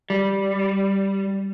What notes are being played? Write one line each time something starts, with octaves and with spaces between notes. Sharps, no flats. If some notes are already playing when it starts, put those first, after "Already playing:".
G3